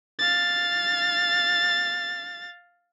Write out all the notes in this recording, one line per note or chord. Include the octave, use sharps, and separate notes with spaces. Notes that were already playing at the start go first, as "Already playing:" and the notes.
F5 A6